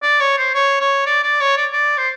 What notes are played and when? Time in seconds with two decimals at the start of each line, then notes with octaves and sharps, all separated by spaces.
0.03 D5
0.20 C#5
0.38 C5
0.54 C#5
0.81 C#5
1.06 D5
1.23 D5
1.41 C#5
1.57 D5
1.73 D5
1.98 C5